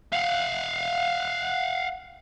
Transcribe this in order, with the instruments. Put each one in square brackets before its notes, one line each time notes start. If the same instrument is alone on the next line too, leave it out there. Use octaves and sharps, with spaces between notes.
[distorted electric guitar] F5 F#5